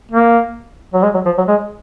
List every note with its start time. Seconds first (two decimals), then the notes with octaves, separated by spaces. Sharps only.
0.11 A#3
0.94 F#3
1.03 G#3
1.14 F#3
1.26 F3
1.38 F#3
1.48 G#3